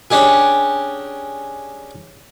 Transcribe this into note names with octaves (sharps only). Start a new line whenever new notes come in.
C#4 D4 G4 G#4